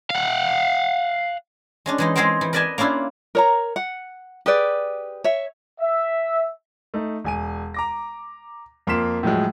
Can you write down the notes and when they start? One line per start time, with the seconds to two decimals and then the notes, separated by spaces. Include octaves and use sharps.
0.10 F5 F#5
1.86 G#3 C#4 D4
1.98 E3 G#3 D#4
2.15 G#3 C4 G#4 A#4 C5 G5
2.41 E3
2.53 A#4 B4 D5 D#5 G#5 A5
2.78 A#3 C#4 D4 E4 F4
3.35 A#4 C#5 A#5
3.76 F#5
4.46 G4 G#4 B4 D5
5.24 C#5 E5
5.80 E5
6.94 A3 D#4
7.24 E1 G#5 D#7
7.74 A#5 D6 A#6
8.87 F2 A#3 F4 C6 B6 E7
9.23 A2 F3 F#3 G#3